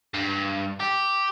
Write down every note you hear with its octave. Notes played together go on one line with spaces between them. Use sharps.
G2
G4